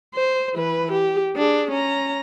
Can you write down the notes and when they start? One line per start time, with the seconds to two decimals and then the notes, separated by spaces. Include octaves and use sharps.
0.15 C5
0.54 E3 B4
0.92 G4
1.36 D4 G#4
1.71 C#4 A#5